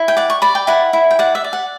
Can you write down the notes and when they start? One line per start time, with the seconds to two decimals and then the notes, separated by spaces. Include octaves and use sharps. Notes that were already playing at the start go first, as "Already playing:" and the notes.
Already playing: E4
0.08 G5
0.17 D5 F#5
0.30 C#6
0.42 D5 B5
0.55 G5
0.67 E4 F#5
0.93 E4
1.11 G5
1.19 D5 F#5
1.35 E5
1.44 D5
1.53 F#5